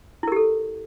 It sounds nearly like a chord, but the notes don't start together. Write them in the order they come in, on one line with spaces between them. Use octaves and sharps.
E4 A#4 G4 A4